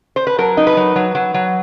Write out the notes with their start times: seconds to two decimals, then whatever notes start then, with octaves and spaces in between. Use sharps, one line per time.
0.16 C5
0.27 B4
0.38 F#3 A#4
0.57 D#4
0.67 B4
0.77 F#3
0.96 F#3
1.15 F#3
1.34 F#3